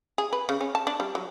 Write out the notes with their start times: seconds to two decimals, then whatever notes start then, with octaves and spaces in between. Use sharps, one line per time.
0.18 G#4
0.33 B4
0.49 C#3
0.61 C#4
0.75 A5
0.87 D4
1.00 G3
1.15 F#3